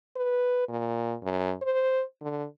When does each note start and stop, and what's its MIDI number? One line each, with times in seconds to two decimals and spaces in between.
0.16 0.64 71
0.69 1.15 46
1.23 1.54 42
1.62 2.03 72
2.22 2.45 50